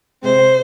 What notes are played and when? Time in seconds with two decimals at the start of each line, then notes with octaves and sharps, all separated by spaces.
0.23 C3 G#3 C4 C5